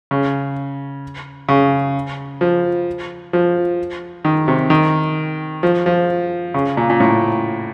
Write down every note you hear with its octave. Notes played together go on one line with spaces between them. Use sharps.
C#3
C#3
F3
F3
D#3
C3
D#3
F3
F3
C#3
A#2
A#2
A2